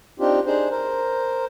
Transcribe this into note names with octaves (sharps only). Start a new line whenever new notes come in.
C4 D4 D#4 F4 G4
D4 D#4 G#4 C5
A#4 C5